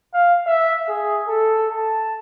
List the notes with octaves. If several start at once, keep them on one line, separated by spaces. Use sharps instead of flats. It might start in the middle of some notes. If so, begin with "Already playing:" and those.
F5
E5
G#4
A4
A5